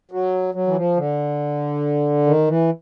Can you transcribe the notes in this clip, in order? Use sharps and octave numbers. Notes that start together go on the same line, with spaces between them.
F#3
F#3
E3
F3
D3
D#3
E3